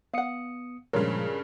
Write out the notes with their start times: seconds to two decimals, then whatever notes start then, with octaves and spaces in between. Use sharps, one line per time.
0.13 B3 F5 F#5 D#6 C#7
0.93 G2 A#2 C#3 F3 G#3 F4 A#4 C#5